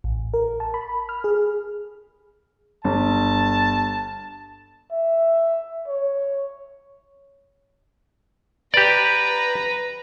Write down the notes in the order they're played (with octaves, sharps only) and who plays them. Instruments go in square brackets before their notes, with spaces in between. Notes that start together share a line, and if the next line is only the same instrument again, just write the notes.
[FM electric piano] A1
A#4
A5
B5
F6
G#4
[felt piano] G1 [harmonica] A5
[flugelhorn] E5
C#5
[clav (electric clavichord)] G4 D5 [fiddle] B4 A#5